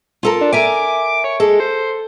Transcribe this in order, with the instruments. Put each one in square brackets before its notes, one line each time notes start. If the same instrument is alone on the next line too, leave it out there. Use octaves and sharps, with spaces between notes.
[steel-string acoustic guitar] F4 A4 A#4
[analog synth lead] D4
[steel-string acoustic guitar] A#4 E5 G#5 [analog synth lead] D6
[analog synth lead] C#5
[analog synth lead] G#3 [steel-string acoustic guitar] A4
[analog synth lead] C5